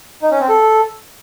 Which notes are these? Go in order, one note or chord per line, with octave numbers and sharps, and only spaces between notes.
D#4
C#4
C4
A4